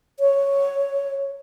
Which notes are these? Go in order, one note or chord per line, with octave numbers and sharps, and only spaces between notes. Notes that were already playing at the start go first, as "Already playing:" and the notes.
C#5